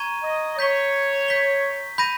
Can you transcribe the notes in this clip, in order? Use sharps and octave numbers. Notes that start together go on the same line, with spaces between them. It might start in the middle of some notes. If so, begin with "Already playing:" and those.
Already playing: A#5 C#6 G#6 D#7
D#5
C#5 G6 B6 G7
G6 B6 G7
B5 G6 A#6 D#7